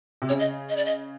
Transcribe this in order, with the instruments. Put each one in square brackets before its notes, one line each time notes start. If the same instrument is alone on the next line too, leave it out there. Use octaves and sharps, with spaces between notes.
[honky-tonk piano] C3
[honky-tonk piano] C#3 [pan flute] C#5
[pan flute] D#5
D#5
D5
D#5